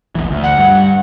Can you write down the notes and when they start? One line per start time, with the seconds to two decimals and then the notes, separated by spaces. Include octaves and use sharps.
0.15 D1 A1 E3
0.31 D2
0.43 F#5
0.57 G2